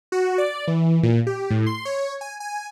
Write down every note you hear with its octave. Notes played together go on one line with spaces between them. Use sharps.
F#4
D5
E3
A#2
G4
A2
C6
C#5
G#5
G#5